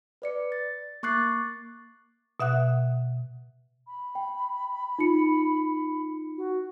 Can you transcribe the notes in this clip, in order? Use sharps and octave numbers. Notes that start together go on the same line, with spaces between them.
B4 D5 C#7
A6
A#3 C#6 D6 F#6 A6 C7
B2 E5 F#5 F#6
B5
G5
D#4 F4 C#7
F#4